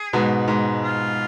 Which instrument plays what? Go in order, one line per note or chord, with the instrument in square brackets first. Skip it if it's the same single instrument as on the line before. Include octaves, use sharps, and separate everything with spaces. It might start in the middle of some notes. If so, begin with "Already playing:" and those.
Already playing: [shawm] G#4
[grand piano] G#2 B2
G#2
[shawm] F4